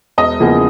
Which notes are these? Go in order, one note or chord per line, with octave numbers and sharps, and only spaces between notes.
E1 D#5
E2 C#3 F3 A#3